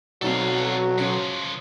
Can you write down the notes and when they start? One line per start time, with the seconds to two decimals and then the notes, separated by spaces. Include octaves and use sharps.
0.22 B1 F#3 C4 D#4 A4 D5 F5
0.98 C#3 F3 C#4 C#5